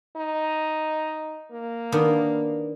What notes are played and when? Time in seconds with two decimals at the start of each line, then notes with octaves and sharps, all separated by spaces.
0.16 D#4
1.52 A#3
1.92 D#3 B3 D4